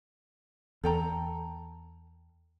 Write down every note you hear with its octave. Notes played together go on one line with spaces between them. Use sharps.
E2 A4 G5 A#5